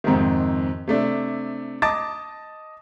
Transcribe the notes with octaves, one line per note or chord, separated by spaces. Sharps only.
F2 G#2 C3 D#3
C3 A3 D4
D#5 A5 D6 A6